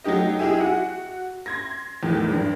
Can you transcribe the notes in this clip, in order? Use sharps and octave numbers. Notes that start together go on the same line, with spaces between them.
F#3 A3 D#4 G4 D#5
D#4 E4 G4 G#4 E5 G#5
F#4 F#5
C6 G#6 A#6
E2 A2 D#3
G#1 G2